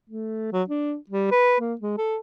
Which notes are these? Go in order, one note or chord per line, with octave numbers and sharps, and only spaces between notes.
A3
F#3
D4
G3
B4
A#3
G#3
A4